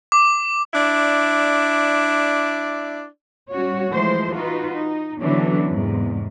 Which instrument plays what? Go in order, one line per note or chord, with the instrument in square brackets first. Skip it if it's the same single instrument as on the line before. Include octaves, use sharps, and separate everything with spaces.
[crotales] D6
[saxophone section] D4 E4 D5
[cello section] G3 C#4 F#4 C#5
E3 F3 G#3 A3 C5
D#4 F4 F#4 B4
D#4
D3 E3 F#3 B3 C#4 D4
E2 G#2 C3